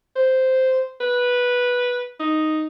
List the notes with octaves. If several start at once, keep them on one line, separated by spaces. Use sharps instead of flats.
C5
B4
D#4